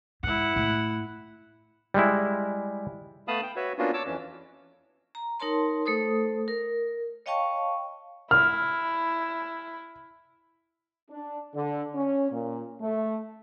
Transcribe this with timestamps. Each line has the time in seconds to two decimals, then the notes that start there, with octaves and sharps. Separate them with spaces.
0.23 G#2 E4 F#5
0.56 A2
1.94 G3 G#3 E4
3.28 A3 B3 F5 A5 B5 D#6
3.43 G5
3.56 F#4 B4 C#5 E5
3.78 A#3 B3 C#4 D4 F4 F#4
3.94 C#5 A5 D6 E6
4.06 F2 E3 C#4
5.15 A#5
5.40 D#4 A#4 C#5 A5 C6
5.86 A3 A4 C5 D#6
6.48 A#4
7.26 C#5 D#5 F5 G5 A5 C#6
8.31 E4 F6
11.10 D4
11.55 D3
11.95 C#4
12.32 A#2
12.81 A3